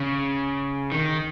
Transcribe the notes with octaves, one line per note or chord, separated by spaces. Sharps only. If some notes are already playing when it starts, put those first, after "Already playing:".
Already playing: C#3
D#3